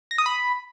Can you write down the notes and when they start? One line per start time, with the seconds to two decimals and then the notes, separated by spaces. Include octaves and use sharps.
0.11 A#6
0.18 D#6
0.26 B5